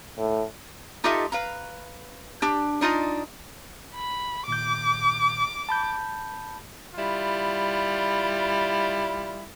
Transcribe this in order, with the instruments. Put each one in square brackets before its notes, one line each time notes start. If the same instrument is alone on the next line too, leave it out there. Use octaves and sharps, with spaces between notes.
[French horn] A2
[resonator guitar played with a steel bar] D#4 F4 G4 A4 D#5 E5
B4 F5 A#5
D4 G4
D4 D#4 F4 D#5
[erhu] B5
[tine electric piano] A#2 D#3 G6 [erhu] D6
[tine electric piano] A5 B5 G6
[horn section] G3 E4 F4